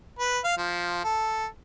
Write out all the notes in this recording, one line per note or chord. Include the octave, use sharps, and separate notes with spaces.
B4
F5
F3
A4